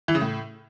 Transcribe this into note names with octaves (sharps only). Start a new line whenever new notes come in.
E3
C#3
A2